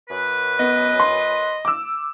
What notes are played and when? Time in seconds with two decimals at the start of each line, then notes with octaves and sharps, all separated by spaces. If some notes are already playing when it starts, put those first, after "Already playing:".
0.09 F#2 B4
0.59 B3 D#5
1.00 C6
1.65 D6 E6